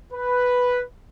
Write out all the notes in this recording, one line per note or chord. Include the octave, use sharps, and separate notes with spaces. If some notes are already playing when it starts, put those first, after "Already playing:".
B4